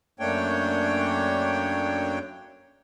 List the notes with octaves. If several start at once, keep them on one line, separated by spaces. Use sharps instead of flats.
F#2 A3 A#3 D4 C#5 G5